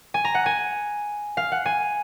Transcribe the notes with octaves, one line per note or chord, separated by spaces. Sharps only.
G#5
A#5
F#5
G#5
F5
F#5
G#5